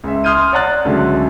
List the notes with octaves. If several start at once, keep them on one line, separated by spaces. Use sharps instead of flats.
C#2 E5
C6 D#6 F6 G6 G#6 D#7
C#5 D5 F#5 A#5 F#6 A6
C#2 D3 F#3 A3